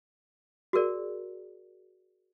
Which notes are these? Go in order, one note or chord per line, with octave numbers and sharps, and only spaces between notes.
F#4 G#4 A#4 D5